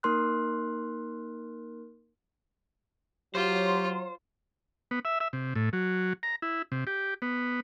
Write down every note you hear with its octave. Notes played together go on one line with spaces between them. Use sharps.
A#3 D#4 A#4 C6 F6 F#6
F#3 F4 G4 C5
B3
E5
E5
C3
A2
F#3
A#5
E4
C3
G4
B3